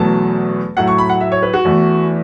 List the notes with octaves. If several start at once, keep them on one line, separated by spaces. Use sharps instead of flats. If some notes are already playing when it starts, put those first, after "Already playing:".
Already playing: E2 B2 F#3 A3 A5
A2 F#3 A3 F#5
C#6
B5
F#5
E5
C#5
B4
F#4
E2 E3 A3